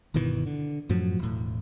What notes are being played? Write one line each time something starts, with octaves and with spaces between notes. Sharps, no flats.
G1 B2 D#3 E3
D3
F#2 A2 F3 F#3
E1 A2